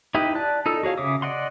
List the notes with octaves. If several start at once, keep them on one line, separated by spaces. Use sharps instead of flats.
D#4 E4 G4 B4 D#5
D5 A5 F#6
D#4 F4 A4 E6
F#4 G#4 C#5 F5
C#3 E5 D6 D#6
D5 D#5 F#5 C6